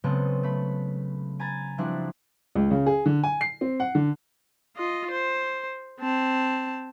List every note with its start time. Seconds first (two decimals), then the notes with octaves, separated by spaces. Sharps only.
0.04 C#3 F#3 G#3 B3 C4 A4
0.43 A3 B5
1.40 G#5 A#5 B5 G#6 A6
1.78 F3 G3 C4 D4 E4 F#4
2.55 C#2
2.71 C#3
2.86 G#4
3.06 D3
3.24 G#5
3.41 C7
3.61 C4
3.80 F#5
3.95 D3
4.76 F4 D#5
5.11 C5
6.00 C4 A5